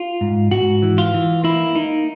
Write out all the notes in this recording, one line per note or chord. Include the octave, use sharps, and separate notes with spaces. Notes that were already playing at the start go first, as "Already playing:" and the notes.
Already playing: F4
G#2
G#2 F#4
E3
F4
E3
A#3 E4
A#3 D#4